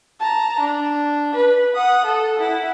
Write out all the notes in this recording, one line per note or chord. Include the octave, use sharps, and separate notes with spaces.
A5 A#5
D4
B4
F#5 D#6
A4
E4 F#5